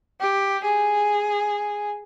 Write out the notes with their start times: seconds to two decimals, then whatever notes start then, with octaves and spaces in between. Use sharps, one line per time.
0.20 G4
0.65 G#4